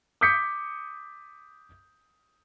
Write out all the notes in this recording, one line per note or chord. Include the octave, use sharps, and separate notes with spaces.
D6 D#6 G6 B6 C#7